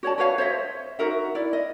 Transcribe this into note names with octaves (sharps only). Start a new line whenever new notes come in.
F#4 C#5 D5 A5
F#4 B4 C#5 F5
C5 C#5 D#5 E5
D#4 F#4 A#4 E5
E4 D5
D#5